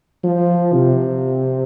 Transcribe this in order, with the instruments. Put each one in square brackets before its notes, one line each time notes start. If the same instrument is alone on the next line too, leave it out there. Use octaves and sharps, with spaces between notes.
[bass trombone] F3
C3